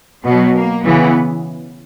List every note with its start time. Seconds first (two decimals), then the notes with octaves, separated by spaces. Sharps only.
0.24 B2 F#3 B3
0.54 A#3
0.84 C#3 E3 B3